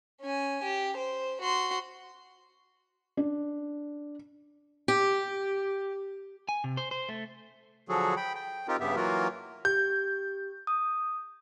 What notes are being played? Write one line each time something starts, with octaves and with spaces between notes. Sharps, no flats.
C#4 G#5
G4
C5
F#4 C6
D4
G4
G#5
C3
C5
C5
A3
D3 F3 F#3 F#4 G#4 A4
G5 B5
G5
C4 D#4 F4 G4 A#4
G2 C#3 B3 G4 E5
E3 F#3 A#3 F4 F#4 A#4
G4 G6
D#6